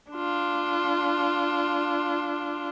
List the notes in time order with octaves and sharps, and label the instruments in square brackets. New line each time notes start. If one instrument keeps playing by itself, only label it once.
[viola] D4 F4